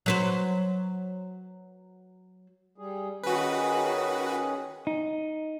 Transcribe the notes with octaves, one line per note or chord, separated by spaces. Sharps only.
F#3 B4 C5
G3 G#4
D#3 C#4 F#4 G#4 B4
D#4